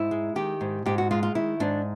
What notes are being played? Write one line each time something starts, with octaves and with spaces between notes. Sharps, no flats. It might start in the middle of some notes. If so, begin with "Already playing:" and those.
Already playing: G#2 E4
G#3
D#3 G4
G#2
G#2 G4
F#4
G#3 F4
F4
D#3 E4
G#2 D4